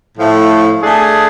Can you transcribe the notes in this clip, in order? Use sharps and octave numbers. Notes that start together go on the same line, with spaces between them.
A2 F3 A3
A3 D4 G#4